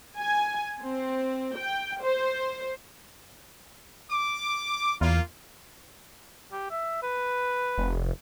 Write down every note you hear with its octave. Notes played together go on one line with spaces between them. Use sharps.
G#5
C4
G5
C5
D6
E2 A#3 F4
G4
E5
B4
F1